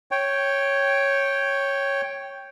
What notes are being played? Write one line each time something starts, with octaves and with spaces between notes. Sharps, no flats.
C#5 G5